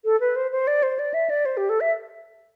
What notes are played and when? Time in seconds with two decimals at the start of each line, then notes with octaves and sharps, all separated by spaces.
0.05 A4
0.20 B4
0.36 C5
0.52 C5
0.67 D5
0.83 C5
0.99 D5
1.14 E5
1.30 D5
1.45 C5
1.57 G4
1.69 A4
1.81 E5